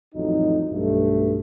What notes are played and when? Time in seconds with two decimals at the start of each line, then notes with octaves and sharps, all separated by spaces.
0.14 A1 F2 F#3 D#4
0.69 B1 G2 A3